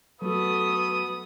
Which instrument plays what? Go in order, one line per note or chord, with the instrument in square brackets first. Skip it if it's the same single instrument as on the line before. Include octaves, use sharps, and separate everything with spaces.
[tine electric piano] F#3 F#4 [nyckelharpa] A3 [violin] B3 [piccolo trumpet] D#6